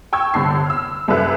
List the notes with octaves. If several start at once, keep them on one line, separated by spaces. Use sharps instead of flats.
G5 C#6 E6 G#6
G1 C2 D3 A5 C7
E6 F6
C2 F#2 A4 B4 E5 F#6